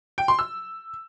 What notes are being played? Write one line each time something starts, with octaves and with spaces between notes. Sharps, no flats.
G5
C6
E6